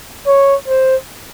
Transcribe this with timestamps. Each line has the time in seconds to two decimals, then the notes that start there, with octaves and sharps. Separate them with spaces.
0.27 C#5
0.67 C5